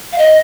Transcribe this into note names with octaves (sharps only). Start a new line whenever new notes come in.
F5
D#5